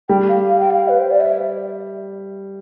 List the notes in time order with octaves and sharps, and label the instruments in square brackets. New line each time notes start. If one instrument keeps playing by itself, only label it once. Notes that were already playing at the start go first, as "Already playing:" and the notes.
[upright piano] G3 [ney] G5
[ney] F5
F5
G5
F5
B4
C5
D5
E5